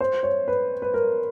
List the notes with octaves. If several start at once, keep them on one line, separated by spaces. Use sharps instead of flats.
C5
C#5
B4
B4
A#4